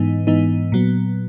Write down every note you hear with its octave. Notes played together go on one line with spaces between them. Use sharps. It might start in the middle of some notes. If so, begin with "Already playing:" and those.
Already playing: G#2 E3 B3 D#4
G#2 E3 B3 D#4
A#2 F#3 B3